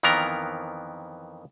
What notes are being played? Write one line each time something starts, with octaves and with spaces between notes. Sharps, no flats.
F2 D#3 E3 B3 A#4 A#5